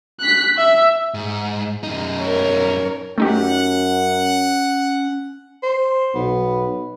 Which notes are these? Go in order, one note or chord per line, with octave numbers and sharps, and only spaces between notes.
F#6 B6
E5
G#2
F#2 D#4
A#4 C#5
F#2 A3 C#4 D#4 G4 F#5
C5
B1 B3